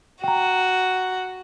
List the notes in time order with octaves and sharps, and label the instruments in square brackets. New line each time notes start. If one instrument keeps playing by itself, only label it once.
[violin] F#4 [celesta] G5 A#5